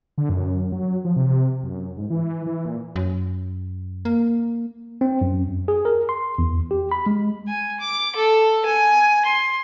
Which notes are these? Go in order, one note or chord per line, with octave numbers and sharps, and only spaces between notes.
D3
F#2
F#3
F3
C3
F#2
G#2
E3
E3
A#2
F#2
A#3
C4
F#2
F#2
G#4
A#4
C6
E2
G4
B5
G#3
G#5
D6
A4
G#5
C6